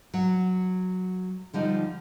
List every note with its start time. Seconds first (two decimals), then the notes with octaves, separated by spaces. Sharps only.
0.14 F#3
1.54 D3 F3 G3 D#4